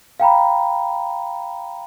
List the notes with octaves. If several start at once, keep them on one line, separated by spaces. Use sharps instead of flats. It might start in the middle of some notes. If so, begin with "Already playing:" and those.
F5 G5 A#5 B5